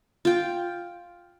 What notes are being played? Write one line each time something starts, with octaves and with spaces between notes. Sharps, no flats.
F4 G5